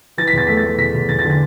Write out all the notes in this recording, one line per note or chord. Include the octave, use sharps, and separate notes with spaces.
E3 A6
B6
E2 A6
A3 B6
A6
A3
E2 B6
E2
E2 A6
A6
D3
A6